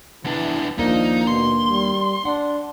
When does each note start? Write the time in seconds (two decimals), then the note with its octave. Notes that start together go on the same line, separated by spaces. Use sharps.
0.25 E2 E3 D4
0.79 D#2 F3 A#3 D4 D#4
1.27 B2 C6
1.68 G3
2.25 D4 F#5